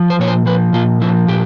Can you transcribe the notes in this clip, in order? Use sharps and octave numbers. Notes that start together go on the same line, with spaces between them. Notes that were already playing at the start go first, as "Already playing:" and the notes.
Already playing: F3
C5
A#2 C#5
C5
F3 B4
A#2 F4
F3 E4
A#2 G4